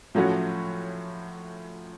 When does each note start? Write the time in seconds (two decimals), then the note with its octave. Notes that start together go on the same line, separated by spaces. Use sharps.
0.15 A2 F3 F#3 A3 C#4 F#4